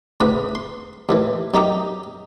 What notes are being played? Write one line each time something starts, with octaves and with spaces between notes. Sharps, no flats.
D2 A2 C#3 B4 D#6
C6
D#2 A2 E3
F#2 D#4 G4 A#5 D#6